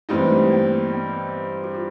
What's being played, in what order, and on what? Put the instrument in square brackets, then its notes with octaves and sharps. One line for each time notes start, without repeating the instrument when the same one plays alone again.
[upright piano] G2 E3 G3 C4 D#4 [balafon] A3
[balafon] G#3
A3
A#3
B3
F#4
F4